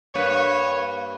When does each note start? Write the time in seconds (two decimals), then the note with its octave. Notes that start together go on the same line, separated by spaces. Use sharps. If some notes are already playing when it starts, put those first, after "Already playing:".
0.15 G2 A#3 B4 C#5